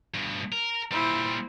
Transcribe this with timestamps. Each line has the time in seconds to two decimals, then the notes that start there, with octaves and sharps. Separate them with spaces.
0.14 G2 B2
0.52 A#4
0.91 A#2 G3 E4 C5